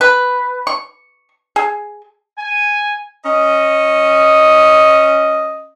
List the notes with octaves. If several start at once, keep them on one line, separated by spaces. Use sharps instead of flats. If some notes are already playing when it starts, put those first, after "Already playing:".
B4
C#6
G#4
G#5
C#4 D#5